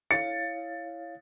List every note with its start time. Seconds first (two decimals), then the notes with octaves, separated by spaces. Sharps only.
0.11 E4 C#5 F5 A6 C#7